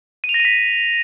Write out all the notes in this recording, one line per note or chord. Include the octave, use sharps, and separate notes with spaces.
D#7
F7
A#6
D#7
B6